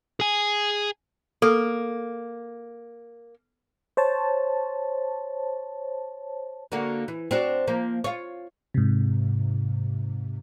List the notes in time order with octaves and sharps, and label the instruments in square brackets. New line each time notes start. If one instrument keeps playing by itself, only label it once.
[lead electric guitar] G#4 G#5
[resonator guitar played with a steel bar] A#3 [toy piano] A4
[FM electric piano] C5 C#5 A5
[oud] D3 A#3 F#4
E3
C4 D4 F#4
F3 A#3
F4 C#5
[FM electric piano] G#2 C3